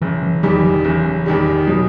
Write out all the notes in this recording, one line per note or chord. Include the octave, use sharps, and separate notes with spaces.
F#1 E3
E3
E2 D#3 F#3 G3
E3
F#1
E2 D#3 G3
B2 F#3